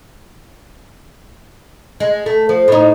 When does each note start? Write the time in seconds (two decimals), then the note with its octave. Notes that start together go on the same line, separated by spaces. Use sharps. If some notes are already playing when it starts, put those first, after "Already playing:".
2.00 G#3
2.26 A3
2.49 F3
2.68 A2 D#4